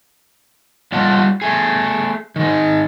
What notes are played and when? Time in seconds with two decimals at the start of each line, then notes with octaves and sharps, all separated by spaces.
0.92 G3 G#3 F4 F#5 A5
1.42 A3 G#4
2.36 D#3 G#3